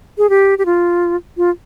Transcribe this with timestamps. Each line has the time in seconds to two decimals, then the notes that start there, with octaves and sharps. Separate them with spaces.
0.18 G#4
0.30 G4
0.58 G4
0.66 F4
1.37 F4